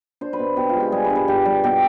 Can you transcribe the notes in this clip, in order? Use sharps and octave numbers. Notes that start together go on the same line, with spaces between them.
D4 C5
B4
B2
B2 G4
F4
G#3
G4
G3 G#4
B4
G2
B4
G2 G4
G3
B2 G4